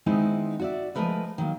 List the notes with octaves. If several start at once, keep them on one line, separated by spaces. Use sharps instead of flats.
D#3 G#3 B3 C4 D#4 E4
F#4 D5 E5
F3 G#3 A3 A#4 B4 D#5
D#3 F#3 A#3